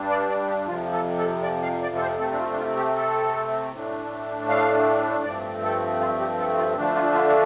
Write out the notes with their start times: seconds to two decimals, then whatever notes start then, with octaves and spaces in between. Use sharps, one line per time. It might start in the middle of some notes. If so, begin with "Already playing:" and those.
Already playing: G2 G3 D4
0.10 D5
0.29 D5
0.48 G4
0.67 F2 C3 F3 F4
0.93 A4
1.18 A4
1.43 D5
1.62 F5
1.82 D5
1.96 A4
2.01 C5
2.19 C3 A3 C4 A4
2.31 D4
2.38 F4
2.52 D4
2.58 F4
2.77 G4
2.96 A4
3.72 A2 A3 D4
4.49 F5
5.24 G2 F3 A3 C4 D5
5.63 A4
6.00 F4
6.20 G4
6.39 A4
6.57 F4
6.77 D3 F3 A3 D4
6.96 F4
7.14 F4